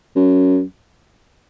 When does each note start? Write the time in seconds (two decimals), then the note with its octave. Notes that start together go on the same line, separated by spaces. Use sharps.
0.16 F#2